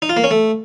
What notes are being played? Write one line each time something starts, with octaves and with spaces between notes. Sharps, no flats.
D#4
F4
A#3
C#4
A3